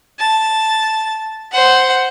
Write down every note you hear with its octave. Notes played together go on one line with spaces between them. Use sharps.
A5
C5 F#5